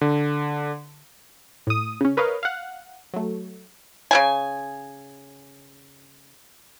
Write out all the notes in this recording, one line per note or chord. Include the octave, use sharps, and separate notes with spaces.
D3
A2 D#6
C#3 C#4
A#4 B4 C#5 D#5 F5
F5 F#5
F#3 A3
C#3 C#4 G#5